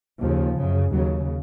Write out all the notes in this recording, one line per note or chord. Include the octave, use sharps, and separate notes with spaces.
D#2 C#3 F3
F#2 C#3
D#2 C#3 F#3